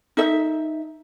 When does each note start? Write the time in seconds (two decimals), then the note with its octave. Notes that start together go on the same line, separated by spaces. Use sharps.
0.17 D#4 A4 E5